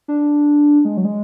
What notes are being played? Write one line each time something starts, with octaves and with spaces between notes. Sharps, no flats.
D4
G#3
F#3
G#3